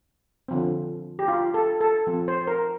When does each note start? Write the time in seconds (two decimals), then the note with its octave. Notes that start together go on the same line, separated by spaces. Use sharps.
0.48 D3 F3 C4
1.19 G4
1.28 F4
1.54 A4
1.81 A4
2.07 F3 C4
2.28 C5
2.47 A#4